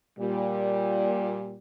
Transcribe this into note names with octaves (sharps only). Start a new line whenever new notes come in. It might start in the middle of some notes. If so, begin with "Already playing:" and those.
A#2 G3